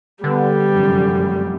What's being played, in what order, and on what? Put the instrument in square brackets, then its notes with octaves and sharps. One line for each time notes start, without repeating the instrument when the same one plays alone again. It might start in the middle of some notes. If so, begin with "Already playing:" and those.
[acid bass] D3 [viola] G3 [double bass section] B3
[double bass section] F1 F#2